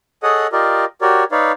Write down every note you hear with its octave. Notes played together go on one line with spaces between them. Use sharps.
G#4 A4 C#5 D#5 F#5 D#6
F4 G4 A#4 D5 D#5
F#4 G4 A#4 C#5 D5
D#4 B4 C#5 D5 F5